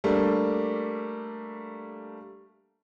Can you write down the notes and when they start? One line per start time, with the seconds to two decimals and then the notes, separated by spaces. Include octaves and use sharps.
0.04 G3 A3 A#3 D4